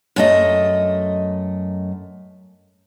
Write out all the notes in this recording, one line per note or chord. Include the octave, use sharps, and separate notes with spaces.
F#2 A3 D#5